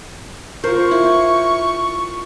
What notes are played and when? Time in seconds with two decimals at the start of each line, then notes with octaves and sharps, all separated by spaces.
0.64 F4 A#4 C5 C#6
0.91 E4